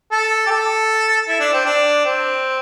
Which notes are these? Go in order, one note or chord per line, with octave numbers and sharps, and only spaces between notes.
A4
G4
A4
E4
D4
C4
D4
C4